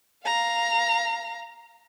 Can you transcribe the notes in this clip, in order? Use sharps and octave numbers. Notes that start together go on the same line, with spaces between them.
F5 A#5